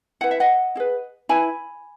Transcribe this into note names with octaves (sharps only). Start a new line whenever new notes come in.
E4 B4 F#5
E5
D#5 F#5
E4 G#4 B4
E4 B4 G#5 B5